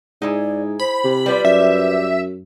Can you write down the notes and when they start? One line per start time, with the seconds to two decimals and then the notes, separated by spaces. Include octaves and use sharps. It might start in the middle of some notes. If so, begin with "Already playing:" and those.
0.22 G#2 D#4 E4 G#4 D5
0.80 C5 B5
1.04 C3
1.26 G3 F4 B4 D5
1.45 F#2 E5